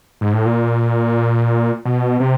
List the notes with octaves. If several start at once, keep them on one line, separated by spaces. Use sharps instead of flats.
G#2
A2
A#2
B2
C3